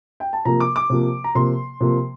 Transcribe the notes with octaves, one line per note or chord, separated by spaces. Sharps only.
G5
A5
C3 F3 A#3 A#5
D6
D6
C3 F3 A#3
A#5
C3 F3 A#3 C6
C3 F3 A#3